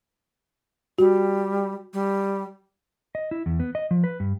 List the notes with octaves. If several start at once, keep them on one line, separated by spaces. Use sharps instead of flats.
G3 F#4
G3
D#5
E4
E2
B3
D#5
F3
B4
G2